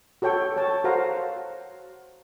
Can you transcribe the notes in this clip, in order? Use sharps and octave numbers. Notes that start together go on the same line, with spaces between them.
F#4 A4 C#5 G5 C#6
A4 C#5 A5
F#4 A#4 C5 F5 F#5 A#5